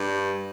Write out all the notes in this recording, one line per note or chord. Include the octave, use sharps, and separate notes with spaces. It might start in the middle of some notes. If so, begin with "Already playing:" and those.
Already playing: G2